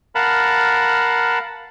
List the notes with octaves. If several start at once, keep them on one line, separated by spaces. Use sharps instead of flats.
A#4 F5 F#5 A5 B5